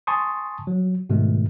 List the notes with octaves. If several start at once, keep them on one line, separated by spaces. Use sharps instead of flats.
G#5 A5 C6 C#6 D#6
F#3
G#2 B2 D#3 G#3 A3